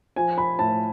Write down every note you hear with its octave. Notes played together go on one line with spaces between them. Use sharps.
F3 G#5
B5
A2 A5